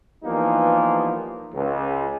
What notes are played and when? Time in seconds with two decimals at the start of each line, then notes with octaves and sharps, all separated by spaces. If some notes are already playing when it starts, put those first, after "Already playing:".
0.24 E3 F3 G3 A#3 B3 D#4
1.54 C#2